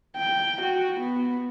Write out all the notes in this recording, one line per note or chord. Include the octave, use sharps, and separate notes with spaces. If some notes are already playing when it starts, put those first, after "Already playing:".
G5
F#4
B3